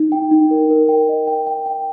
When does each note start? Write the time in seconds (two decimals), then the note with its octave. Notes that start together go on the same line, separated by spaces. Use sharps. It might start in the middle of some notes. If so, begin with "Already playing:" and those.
Already playing: D#4
0.12 G5
0.31 D#4
0.51 A#4
0.70 A#4
0.89 G5
1.09 D#5
1.27 G5
1.47 G5
1.66 G5